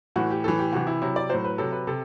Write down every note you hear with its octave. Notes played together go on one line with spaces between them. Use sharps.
A2 E3 F#4
G4
A2 E3 A4
G4
C3 E3 F#4
E4
C3 F#3 E4
D5
A2 F#3 C5
B4
C3 F#3 A4
B4
C3 A4